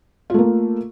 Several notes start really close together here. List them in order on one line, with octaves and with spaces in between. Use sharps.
F4 A3 A#3